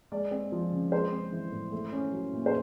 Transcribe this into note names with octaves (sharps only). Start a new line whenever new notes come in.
G#3 D5
C4
F3
C#3
G#3 C5
C4
E3
A2
A3
C#4
F#3
A#2
C5